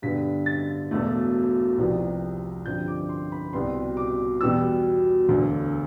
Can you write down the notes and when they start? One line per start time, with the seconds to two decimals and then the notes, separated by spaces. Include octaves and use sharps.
0.02 G2 D3 G3 B3 B6
0.46 A6
0.91 E1 E2 B2 A3
1.78 C2 C3 F3 B3
2.66 G2 D3 F3 C4 G6
2.88 D6
3.09 C6
3.32 B5
3.53 C2 B2 G3 B3 C6
3.97 D6
4.41 E2 B2 G3 B3 E6
5.29 E1 D2 D3